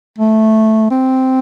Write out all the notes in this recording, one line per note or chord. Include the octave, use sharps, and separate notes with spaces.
A3
C4